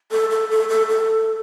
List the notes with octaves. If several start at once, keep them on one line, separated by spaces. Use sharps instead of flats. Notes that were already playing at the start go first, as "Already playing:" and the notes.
A4
A4
A4
A4
A4